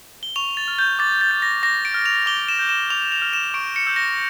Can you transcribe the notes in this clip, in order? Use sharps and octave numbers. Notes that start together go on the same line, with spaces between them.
G7
C#6 F7
A6
F6
G6
D6 A6
A6
G6
A#6
D6 A#6
D7
F6
F7
D6 G7
E7
G6
E7
D6 F7
F7
F6
E7
C#6 D7
C#7
E6 G6
A#6